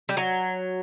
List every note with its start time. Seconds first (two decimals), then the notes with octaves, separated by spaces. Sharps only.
0.09 G3
0.17 F#3